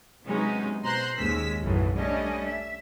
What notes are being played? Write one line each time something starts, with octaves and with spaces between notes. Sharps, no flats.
C3 F#3 G#3 B3 C#4 D#4
B2 C5 A#5 C6 F#6 G6
D#2 G#3 C#4 E6 B6
B1 F#2 A2 C#3 E3 F#3
G3 A3 C#4 D4 D#5
E5